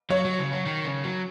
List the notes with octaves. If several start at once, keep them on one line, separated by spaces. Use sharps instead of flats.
F#3 C#5
F#3
C#3
F#3
D#3
C#3
F#3